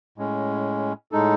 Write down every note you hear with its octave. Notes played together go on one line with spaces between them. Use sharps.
A2 G#3 C#4
A2 G#3 D#4 A4